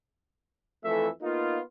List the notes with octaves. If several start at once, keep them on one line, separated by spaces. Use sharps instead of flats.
F2 E3 A3 A4 E5
A#3 B3 D#4 F4